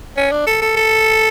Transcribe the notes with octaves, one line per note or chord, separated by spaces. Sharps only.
C#4
D4
A4
A4
A4